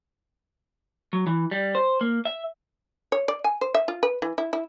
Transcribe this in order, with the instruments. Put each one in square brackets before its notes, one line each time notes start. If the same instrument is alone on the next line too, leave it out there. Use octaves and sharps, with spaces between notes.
[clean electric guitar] F#3
E3
G3
C5
A#3
E5
[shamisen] C#5
D5
G#5
C5
E5
F4
B4
E3
E4
E4